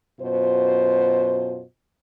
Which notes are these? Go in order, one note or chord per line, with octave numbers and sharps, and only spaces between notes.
F#2 B2 F4 C5